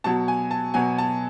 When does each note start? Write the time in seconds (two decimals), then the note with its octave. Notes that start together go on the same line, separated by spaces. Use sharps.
0.04 B2 F#3 A5
0.28 G#5
0.51 A5
0.74 B2 F#3 G#5
0.98 A5